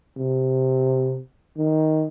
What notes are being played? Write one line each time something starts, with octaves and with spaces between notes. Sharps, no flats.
C3
D#3